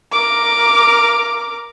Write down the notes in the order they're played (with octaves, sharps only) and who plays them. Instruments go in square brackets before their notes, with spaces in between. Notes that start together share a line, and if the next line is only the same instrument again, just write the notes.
[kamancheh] A#4 D6